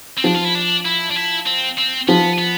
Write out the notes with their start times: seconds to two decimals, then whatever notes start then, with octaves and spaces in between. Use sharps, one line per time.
0.18 C4
0.24 F3 D4
0.35 F4
0.45 E4
0.55 D4
0.86 E4
1.11 D4
1.16 E4
1.46 C4
1.78 C4
2.08 F3 B3
2.38 B3